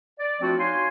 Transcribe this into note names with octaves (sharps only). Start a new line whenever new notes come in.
D5
F3 A3 C4 D4 F4 F#4
D#4 F#4 C#5 F5 G#5 C6